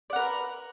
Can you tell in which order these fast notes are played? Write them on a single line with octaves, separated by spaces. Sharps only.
D5 F#5 A#4 B4